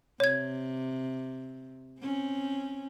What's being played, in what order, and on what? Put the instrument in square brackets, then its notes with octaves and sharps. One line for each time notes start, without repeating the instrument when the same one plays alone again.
[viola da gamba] C3 [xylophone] C#5 G#6
[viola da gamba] C4 C#4